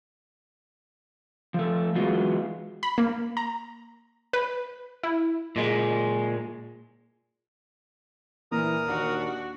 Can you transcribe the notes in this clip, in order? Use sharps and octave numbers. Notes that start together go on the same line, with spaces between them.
F3 A3
E3 F#3 G#3 B3 F4 F#4
B5
A#3
A#5
B4
E4
A#2 G#3
A#2 E3 A#4 A#5 D#6
D#2 D4 F#4